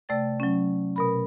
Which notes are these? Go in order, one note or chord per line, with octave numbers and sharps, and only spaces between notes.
C3 A3 D5 G5 A6
F#3 C#4
B2 A#4 B5